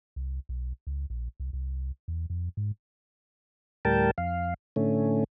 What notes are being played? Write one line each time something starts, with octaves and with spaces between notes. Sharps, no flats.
C2
B1
C#2
A#1
C2
C2
E2
F2
G#2
D2 A2 G3 A#4 G5 A5
F2 F5
A2 D3 A3 C#4